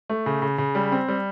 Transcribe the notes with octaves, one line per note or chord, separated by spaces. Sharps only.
A3
C#3
C#3
C#3
G3
C4
G3